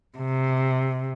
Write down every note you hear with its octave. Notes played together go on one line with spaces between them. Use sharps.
C3